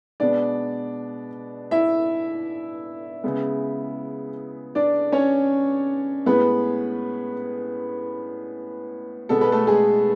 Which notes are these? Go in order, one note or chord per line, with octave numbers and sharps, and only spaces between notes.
B2 G#3 B3 D4 D5
E4 E5
C#3 G#3 B3
D4 D5
C#4 C#5
A2 G#3 B3 B4
B2 G#3 B3 A4
B4
A3 A4
G#3 G#4